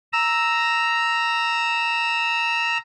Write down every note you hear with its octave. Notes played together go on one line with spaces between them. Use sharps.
A#5 E6